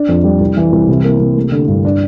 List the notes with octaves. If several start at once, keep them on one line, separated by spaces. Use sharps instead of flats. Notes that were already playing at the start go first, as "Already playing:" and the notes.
Already playing: D4
F2
G3
C2
E3
C2
C3
A#3
C3
A3
D3
G2
D4